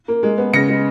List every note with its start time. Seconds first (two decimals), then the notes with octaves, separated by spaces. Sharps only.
0.08 A#3
0.23 G#3
0.38 B3
0.53 C#3 A#6 C#7
0.69 G#3